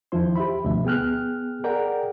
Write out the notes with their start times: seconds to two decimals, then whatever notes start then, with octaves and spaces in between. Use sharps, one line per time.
0.12 E2 D#3 F3 E4 C5 C6
0.36 G4 E5 B5
0.64 D2 G2 B2 F3 E5
0.85 B3 G#4 G5 F6 F#6
1.64 G#4 A#4 D5 F#5 G5 A#5